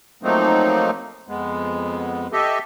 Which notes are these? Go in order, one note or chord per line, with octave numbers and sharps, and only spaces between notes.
F3 F#3 A3 A#3 C4 D#4
F2 G#3 B3
G4 A4 D#5 E5